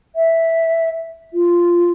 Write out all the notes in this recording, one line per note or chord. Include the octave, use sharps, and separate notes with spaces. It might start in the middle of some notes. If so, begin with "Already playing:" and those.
E5
F4